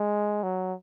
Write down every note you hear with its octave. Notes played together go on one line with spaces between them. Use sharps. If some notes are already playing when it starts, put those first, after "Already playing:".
Already playing: G#3
F#3